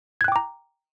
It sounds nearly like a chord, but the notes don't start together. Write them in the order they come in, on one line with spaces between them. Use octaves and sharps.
G#6 F#6 G5 D6 A#5